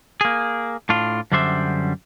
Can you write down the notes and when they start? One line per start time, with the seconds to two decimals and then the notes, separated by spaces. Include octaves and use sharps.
0.21 A#3 G#4
0.89 A2 D4 F4
1.32 F#2 D3 G3 D4 C5 E5